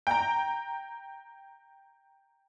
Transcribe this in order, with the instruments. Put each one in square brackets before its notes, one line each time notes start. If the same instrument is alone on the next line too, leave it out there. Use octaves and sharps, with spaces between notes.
[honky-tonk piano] G5 A#5